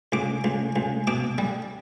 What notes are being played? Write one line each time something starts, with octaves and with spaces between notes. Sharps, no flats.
C#2 D6
C#2
C#2
B2 D6
G3